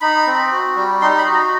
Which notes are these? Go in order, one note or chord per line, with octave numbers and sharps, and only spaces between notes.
D#4 B5
C4
F#4
G3
D#4 C6
B5
F#4
A#5